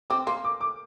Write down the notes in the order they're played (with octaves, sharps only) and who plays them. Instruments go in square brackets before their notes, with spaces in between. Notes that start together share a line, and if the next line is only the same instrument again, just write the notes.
[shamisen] C4 [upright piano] D6
[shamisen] A#3 [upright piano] C6
[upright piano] D6
D6